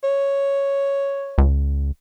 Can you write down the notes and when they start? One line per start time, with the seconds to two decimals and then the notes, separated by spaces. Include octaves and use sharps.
0.03 C#5
1.38 C#2